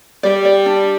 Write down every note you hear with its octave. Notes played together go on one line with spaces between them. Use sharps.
G3 D5
D5
D4